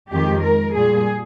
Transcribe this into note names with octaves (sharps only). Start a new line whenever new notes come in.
F2 D#3 G#3 G4
A#4
A#2 G3 G#4